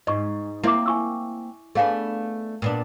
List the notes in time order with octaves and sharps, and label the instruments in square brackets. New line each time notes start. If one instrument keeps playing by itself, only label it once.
[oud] G#2 [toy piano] D#5 C#6
[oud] A#3 C4 [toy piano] E4 E5 D6
[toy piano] G#5 C#6 E6
[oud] A3 B3 D4 [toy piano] G#4 F5 G#5
[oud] A#2 B3 D4